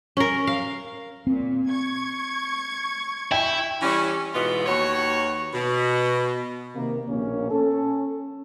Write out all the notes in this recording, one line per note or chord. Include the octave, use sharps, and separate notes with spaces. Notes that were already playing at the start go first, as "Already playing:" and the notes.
C#4 A#4
F5
A#2 C4
C#6 G#6
E4 G5
E3 G3 C#4
G#2 B2 E3 B3 F4
D#2 F#4 C#5
B2
C3 D#3 A#3
A#1 B2 A#3 C#4
C#4 A4